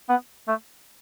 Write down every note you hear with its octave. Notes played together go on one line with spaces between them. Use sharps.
B3
A3